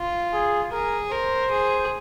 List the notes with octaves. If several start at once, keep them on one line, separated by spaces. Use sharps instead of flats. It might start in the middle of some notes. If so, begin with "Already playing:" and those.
Already playing: F4
G#4
G#4 A#4
A#4 C5
G#4